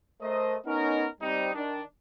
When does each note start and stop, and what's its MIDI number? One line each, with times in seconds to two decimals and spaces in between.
0.21 0.56 57
0.21 0.56 70
0.21 0.56 72
0.21 0.56 75
0.66 1.07 59
0.66 1.07 61
0.66 1.07 63
0.66 1.07 70
1.21 1.53 55
1.21 1.53 60
1.21 1.53 63
1.55 1.82 51
1.55 1.82 62